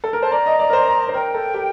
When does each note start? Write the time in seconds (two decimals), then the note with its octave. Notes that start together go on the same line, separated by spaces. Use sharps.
0.04 A4
0.13 A#4
0.22 C5 A5
0.32 D5 A#5
0.46 D#5
0.59 D5
0.69 A#4
0.73 C5
1.09 C5
1.14 A#4 G5
1.34 A4
1.54 G4